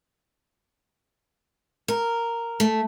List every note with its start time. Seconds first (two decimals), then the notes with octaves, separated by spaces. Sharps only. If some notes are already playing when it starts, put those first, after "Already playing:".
1.88 A#4
2.60 A3